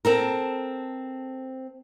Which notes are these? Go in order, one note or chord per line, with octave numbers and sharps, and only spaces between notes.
C4 A4 A#4